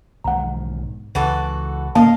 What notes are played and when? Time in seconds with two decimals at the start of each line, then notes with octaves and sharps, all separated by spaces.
0.24 B1 G#2 D#3 F#5 A#5
1.15 C#2 E3 F#4 A4
1.95 D1 A#3 C#4 D#5 F5 A5